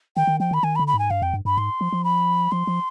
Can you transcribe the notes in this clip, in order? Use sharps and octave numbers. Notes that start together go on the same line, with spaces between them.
D#3 G5
D#3
F3 G5
D#3 B5
D#3 G#5
B5
D3
B5
G#2 G#5
G2 F5
F2 G5
G2
G2 B5
G#2 C6
F3
F3
B5
F3 C6
F3